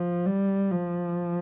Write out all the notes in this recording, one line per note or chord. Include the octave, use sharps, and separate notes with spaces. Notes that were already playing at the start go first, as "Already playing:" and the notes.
Already playing: F3
G3
F3